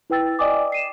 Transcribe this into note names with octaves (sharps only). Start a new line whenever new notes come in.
E4 B4 G5 E6 A6
D5 D#5 G5 G#5 D6 D#6
C7 D#7 E7